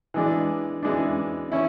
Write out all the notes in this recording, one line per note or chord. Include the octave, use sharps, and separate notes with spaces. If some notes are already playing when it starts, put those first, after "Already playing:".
E3 G#3 D4
E3 G#3 D4
C#4 E4